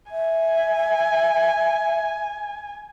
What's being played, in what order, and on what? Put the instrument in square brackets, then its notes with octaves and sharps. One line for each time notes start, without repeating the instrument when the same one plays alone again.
[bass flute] E5 [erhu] G#5